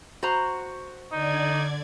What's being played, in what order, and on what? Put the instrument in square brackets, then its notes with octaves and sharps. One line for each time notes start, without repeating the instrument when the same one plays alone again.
[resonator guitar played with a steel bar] F#4 C5 A#5
[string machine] D3 D5 G#6 [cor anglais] D#4